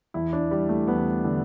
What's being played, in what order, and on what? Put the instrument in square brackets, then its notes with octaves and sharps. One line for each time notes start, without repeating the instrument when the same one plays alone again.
[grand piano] E2 E4
D4
G3
A3
E2 B3
D3